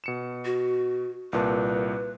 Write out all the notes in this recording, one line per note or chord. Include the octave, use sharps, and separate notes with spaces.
B2 C#7 E7
F#4
C2 A#2 B4 A5